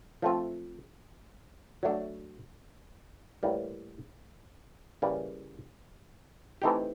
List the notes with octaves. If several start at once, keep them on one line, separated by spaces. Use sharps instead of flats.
F3 A3 C4 F4
F#3 A3 D4
A2 E3 G3 A#3
C#3 E3 G3 A#3
E3 A3 C4 D#4 G4